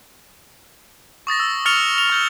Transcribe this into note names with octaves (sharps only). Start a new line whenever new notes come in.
C#6 D#6 A6 A#6
E6
C#6 F6 A6 C#7 F7 G7
F7
C#6 G6 G7